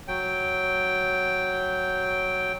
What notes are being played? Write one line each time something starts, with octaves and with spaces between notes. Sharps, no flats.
F#3 G5